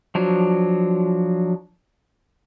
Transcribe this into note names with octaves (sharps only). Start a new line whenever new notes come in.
F3 F#3 D4